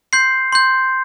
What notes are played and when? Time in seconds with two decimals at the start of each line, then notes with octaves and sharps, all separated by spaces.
0.13 C6 G6 C7
0.52 C6 G6